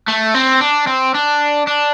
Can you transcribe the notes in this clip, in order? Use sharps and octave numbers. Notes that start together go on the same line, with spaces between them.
A3
C4
D4
C4
D4
D4